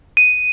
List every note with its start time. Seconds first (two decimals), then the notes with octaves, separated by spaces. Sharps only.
0.17 D#7